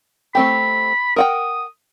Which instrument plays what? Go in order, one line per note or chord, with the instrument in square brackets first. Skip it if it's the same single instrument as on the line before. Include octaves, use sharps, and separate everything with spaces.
[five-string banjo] A3 C4 G4 [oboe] B5
[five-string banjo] A#4 F#5 G5 [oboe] D#6